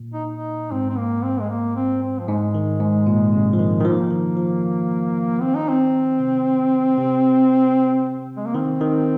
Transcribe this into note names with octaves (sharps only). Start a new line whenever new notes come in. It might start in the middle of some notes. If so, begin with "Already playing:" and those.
Already playing: A#2
D#4
D#4
G#2 C4
C4
A#3
C4
G#3
A#3
C4
C4
F3
G#2 G#3
D#3
G#2
A#2
C3
F3
D#3
D#3
F3 A#3
D#3
F3
D#3 C4
D#4
C4
C3
C3
G#3
A#3
D#3 C4
D#3